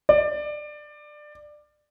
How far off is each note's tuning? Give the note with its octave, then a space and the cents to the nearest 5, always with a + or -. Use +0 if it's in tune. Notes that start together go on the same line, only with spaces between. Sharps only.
D5 +20